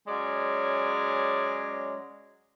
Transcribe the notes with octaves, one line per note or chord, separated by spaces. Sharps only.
F#3 G#3 C#4 D5